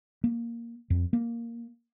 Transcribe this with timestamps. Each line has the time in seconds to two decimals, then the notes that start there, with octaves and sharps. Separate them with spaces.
0.24 A#3
0.90 F2
1.13 A#3